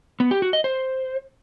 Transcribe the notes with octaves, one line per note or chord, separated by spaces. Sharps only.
B3
G4
F#4
D#5
C5